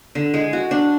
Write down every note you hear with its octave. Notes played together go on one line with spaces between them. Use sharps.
D3
G#3
F#4
D4